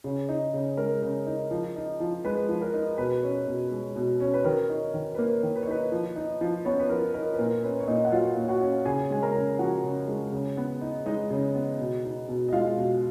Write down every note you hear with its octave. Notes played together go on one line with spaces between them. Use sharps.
C#3
D#4
C#3
G#3 A#4
C#3
D#4
F3
D#4
F3
G#3 B4
F3
A#4
D#4
B2 B4
C#4
B2
G#3
B2
C#4
B4
D#3 A#4
D#4
D#3
B4
A#3 A#4
D#3
B4
C#5
D#4 B4
F3
D#4
F3
B3 C#4 C#5
B4
F3 A#4
D#4 A#4
B4
A#2 A#4
C#4 B4
C#5
A#2 D#4 D#5
F#5
F#3 F4 F5
A#2
F#4 F#5
C#4
C#3 G#4 G#5
G#3 G#5
A#4 A#5
C#3
F3 F#4 F#5
C#3
G#3
C#3
B3
D#4
G#3 D#4 D#5
C#3
B3
B2
D#4
B2
D#5
G#3 F4 F5
B2